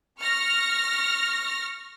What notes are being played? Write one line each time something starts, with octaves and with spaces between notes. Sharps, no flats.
C#6 F6 A#6